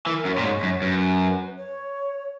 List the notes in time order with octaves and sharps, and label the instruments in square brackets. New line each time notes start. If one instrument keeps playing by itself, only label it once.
[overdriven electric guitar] E3 [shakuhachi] A#4
[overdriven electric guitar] F#2
[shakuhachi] C#5
[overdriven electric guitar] A#2
G#2
[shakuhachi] C#5
[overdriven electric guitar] F#2
[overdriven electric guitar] F#2 [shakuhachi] B4
[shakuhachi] C#5